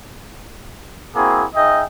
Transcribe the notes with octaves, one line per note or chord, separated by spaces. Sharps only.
A#3 C4 E4 F#4 G#4
D#4 G#4 D#5 E5 G5